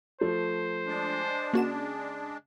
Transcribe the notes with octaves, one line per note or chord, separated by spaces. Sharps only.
F3 A3 C5
G#3 D4
C#3 A#3 F#4 E7